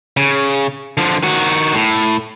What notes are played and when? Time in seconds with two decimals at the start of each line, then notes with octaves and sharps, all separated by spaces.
0.17 C#3
0.97 D3 F3
1.23 D#3 F#4
1.75 A2